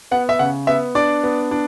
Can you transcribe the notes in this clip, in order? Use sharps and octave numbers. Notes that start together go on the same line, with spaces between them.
B3 F#5
E5
C#3 F#5
B3 E5
D4 D5
B3
D4